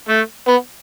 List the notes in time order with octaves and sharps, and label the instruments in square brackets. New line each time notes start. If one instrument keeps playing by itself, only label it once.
[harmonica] A3
B3